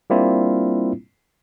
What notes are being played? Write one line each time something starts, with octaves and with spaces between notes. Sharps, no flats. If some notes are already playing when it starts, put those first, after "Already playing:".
G3 A#3 C4 D4 E4 F4